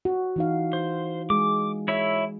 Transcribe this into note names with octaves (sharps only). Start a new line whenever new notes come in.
F#4
E3 D#4 F5
C5
G#3 G#4 D6
E4 C#5 E5